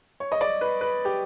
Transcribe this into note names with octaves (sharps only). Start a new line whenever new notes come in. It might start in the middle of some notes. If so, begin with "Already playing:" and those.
C#5
D#5
D5
B4
B4
G4